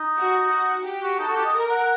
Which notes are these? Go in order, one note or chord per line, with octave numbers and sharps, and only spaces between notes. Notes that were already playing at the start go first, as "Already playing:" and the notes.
Already playing: D#4
F#4
F#4
G4
F#4
D#4 A4
F#4
G4
D#5
A#4
F#5